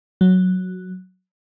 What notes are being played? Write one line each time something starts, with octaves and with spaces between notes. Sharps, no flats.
F#3